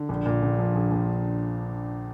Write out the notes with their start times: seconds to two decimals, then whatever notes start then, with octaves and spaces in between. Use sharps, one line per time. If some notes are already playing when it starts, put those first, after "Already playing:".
Already playing: D3
0.09 A#1
0.26 A#2
0.43 A#1
0.59 F3
0.75 A#1
0.91 A#1